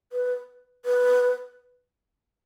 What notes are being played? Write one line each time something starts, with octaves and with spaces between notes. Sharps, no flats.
B4
B4